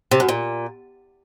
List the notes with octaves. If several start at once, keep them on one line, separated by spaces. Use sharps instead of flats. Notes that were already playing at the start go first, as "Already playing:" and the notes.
C3
F#2
A#2